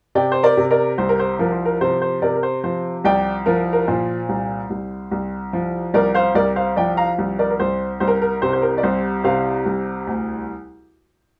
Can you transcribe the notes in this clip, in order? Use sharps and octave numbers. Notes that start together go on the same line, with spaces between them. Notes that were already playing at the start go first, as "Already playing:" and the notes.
C3 D5 G5
C5
A#4 D5
C3
A#4 D5
C2 C5
A#4
C5
F3 A#4
C5
A#4
C3 C5
C5
C3 A#4 D5
A#4
C5
F3 C5
C2 D5 G5
F3 A#4
A#4
A#2 C5
C2
C2
C2
F3
C2 A#4 D5
C5 F5
C2 A#4 D5
C5 F5
F3 D5 G5
F5 A#5
C2
A#4 D5
A#4
C2 C5
C2 C5
A#4
A#4
C3 C5
C5
A#4
D5
C2 C5
C3 C5 F5
C2
D2